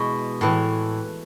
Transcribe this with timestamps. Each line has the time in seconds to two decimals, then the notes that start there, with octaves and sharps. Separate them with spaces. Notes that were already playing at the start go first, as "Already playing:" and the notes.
Already playing: B2 E3 G#3
0.41 A2 E3